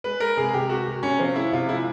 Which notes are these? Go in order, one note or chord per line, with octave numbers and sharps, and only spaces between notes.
G#3 B4
G#3 A#4
C3 G#4
C3 G4
G#3 F#4
C3
C3 C#4
F3 C4
G#3 E4
C3 F4
G#3 E4